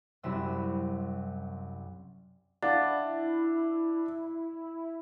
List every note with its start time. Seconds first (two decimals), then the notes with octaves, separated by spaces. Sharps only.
0.23 C2 F#2 C3 E4 E6
2.62 D4 E4 F5 F#5 A6